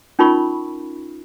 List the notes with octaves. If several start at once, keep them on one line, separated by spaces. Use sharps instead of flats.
C#4 D#4 F4 A#4 B5 C#6